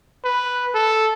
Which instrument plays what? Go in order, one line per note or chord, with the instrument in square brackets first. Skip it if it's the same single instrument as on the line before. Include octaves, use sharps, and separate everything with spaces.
[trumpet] B4
A4